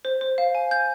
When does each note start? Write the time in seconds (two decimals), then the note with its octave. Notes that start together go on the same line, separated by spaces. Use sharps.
0.05 C5
0.21 C5
0.38 F5
0.55 G#5
0.71 G6